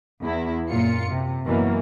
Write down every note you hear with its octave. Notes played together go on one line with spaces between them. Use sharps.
E2 E4
F#2 A#2 F4 C#7
C3
F#2 B2 E3 F#3 A#3